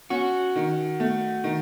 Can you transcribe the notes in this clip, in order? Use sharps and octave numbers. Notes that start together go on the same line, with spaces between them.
C#4 F#4
D#3
A3
D#3